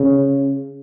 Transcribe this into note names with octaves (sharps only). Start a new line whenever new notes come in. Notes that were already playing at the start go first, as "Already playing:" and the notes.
Already playing: C#3